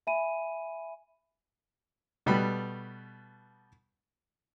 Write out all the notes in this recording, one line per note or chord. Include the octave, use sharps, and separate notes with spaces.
E5 G#5 B5 D#7
B2 G3 A3 B4 B5